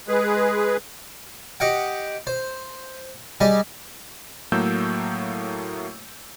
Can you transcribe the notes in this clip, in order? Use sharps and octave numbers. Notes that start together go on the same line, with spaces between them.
G#3 G#4 B4
G4 D#5 F#5 G5
C5
G3 G#4 D#5
A2 F#3 A3 A#3 E6 G6